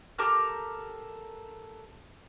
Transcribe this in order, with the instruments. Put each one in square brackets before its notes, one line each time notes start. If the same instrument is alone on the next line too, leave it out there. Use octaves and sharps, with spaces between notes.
[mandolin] G4 A4 A#4 F6